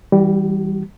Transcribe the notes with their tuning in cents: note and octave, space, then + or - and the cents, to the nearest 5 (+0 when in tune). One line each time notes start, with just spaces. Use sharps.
E3 -15 G3 +0 F#4 +45